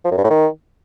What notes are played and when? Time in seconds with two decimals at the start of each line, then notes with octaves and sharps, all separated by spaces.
0.05 F3
0.11 F#2
0.18 G2
0.24 A2
0.30 D#3